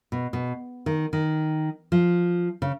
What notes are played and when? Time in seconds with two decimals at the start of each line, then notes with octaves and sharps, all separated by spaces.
0.12 B2
0.33 B2
0.86 D#3
1.13 D#3
1.92 F3
2.62 C#3